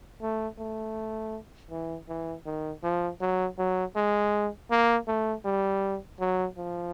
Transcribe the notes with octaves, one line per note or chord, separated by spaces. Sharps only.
A3
A3
E3
E3
D#3
F3
F#3
F#3
G#3
A#3
A3
G3
F#3
F3